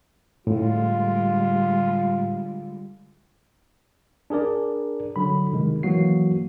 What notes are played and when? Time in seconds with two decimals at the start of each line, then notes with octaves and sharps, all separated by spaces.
0.47 A2 D3 G3 G#3 F4
4.30 D4 G#4 A#4 D5
5.16 D3 F#3 B5
5.53 C3 D#3 G#3
5.83 E3 F#3 A#3 F#4 C7